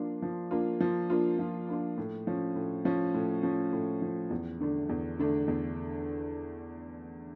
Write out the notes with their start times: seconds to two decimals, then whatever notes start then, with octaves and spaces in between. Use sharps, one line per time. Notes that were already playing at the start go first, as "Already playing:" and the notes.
Already playing: F3 A#3 D4 F4
0.22 F3
0.51 A#3 D4 F4
0.80 F3
1.10 A#3 D4 F4
1.39 F3
1.68 A#3 D4 F4
1.97 A2
2.27 F3 C#4
2.56 A2
2.85 F3 C#4
3.14 A2
3.43 F3 C#4
3.73 A2
4.02 F3 C#4
4.31 E2
4.60 D3 A3 D4
4.89 E2
5.19 D3 A3 D4
5.48 E2